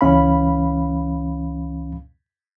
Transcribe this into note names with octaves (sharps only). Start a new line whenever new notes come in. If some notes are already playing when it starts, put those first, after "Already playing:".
C#2 E3 C#4 F5 B5